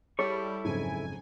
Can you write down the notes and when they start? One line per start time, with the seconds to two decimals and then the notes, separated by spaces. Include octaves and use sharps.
0.19 G3 E4 G#4 A4 C#5 C#6
0.64 F#1 F2 G#2 G#5